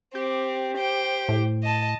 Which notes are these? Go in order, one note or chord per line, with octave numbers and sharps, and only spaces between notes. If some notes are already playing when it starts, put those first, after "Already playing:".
C4 G4
C5 G5
A2
D#5 A5